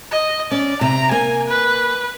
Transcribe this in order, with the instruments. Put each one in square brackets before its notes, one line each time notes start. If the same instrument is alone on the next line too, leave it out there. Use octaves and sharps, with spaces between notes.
[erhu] D#5
[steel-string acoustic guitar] C#4 [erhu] D5
[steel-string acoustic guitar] C3 G5 [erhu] A#5
[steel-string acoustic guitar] A#3 [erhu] G#5
[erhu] B4